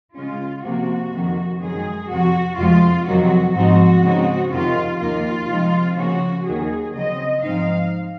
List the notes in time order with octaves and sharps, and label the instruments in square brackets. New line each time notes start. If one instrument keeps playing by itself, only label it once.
[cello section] C#3 G#3 C#4 F4
C3 F3 A#3 F#4
F2 C3 D#3
F#2 D#3 G#3 G#4
F2 C3 F3 F#4
F2 C3 F3 G#3 F4
F2 C3 D#3 F#3 F#4
G#2 F3 C4 D#4 F#4
C#3 G#3 C4 D#4
F2 C3 D#3 F4
D#2 D#3 A#3 F4
C3 F3 G#3 C4 D#4
C#3 F3 A#3 C#4 F#4
D#2 D#3 F#3 G#4
C#3 F#3 C4 D#5
G#2 F3 C4 D#4 F5